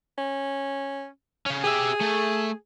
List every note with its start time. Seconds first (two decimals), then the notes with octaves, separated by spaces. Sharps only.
0.18 C#4
1.46 C#3 C#4
1.64 G4 G#4 E5
2.01 A3